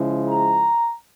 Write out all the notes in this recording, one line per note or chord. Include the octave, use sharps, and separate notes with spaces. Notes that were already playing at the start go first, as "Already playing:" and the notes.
Already playing: C#3 F3 G#3 E4
A#5